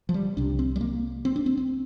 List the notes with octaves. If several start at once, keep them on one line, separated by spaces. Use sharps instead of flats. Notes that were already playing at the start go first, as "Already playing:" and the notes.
F3
G3
C2 C3 D4
C4
G3
A#3
C4
D4
C4
C4